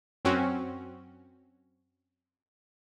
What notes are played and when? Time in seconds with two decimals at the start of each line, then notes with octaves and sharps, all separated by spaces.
0.25 F#2 C4 C#4 F#4